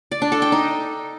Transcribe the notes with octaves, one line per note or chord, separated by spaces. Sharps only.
D5
D4
A4
G5
D#4